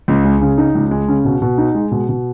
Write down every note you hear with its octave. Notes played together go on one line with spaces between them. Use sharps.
C#2
G#3
C#3
D#4
C#2
G#3
C#3
B2
B2
D#4
G#3
B2
B2